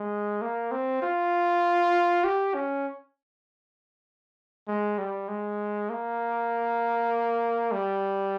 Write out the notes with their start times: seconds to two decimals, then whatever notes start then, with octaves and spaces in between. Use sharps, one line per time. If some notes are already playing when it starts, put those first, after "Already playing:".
Already playing: G#3
0.41 A#3
0.71 C4
1.02 F4
2.24 G4
2.54 C#4
4.68 G#3
4.98 G3
5.28 G#3
5.90 A#3
7.72 G3